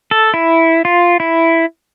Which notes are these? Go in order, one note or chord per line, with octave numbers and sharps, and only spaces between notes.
A4
E4
F4
E4